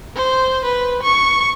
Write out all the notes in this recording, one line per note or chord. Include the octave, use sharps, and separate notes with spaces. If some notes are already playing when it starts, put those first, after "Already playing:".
C5
B4
C#6